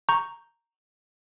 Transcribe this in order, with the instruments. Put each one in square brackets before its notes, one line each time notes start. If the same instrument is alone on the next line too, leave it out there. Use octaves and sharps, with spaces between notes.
[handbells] A#5 C#6 G6